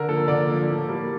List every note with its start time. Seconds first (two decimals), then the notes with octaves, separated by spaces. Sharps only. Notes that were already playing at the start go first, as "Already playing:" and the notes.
Already playing: D3 A#4
0.08 F3 A#3 A4
0.28 D3 D5
0.48 F3 A#3
0.69 A2
0.89 G3 A#3